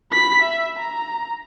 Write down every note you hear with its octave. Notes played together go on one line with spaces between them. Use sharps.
B5 B6
E5
A#5